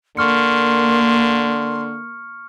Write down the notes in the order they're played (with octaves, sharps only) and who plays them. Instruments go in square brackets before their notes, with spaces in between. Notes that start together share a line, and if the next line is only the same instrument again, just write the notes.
[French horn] D3 [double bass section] A#3 [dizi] C6 [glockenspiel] C#6 F6 C#7